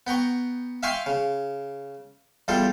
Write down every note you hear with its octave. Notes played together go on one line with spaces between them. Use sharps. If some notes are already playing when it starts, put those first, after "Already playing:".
B3 G5 A#5 C#6
E5 F5 G5 G#5 C6 C#6
C#3
E2 G3 F4 A4 G5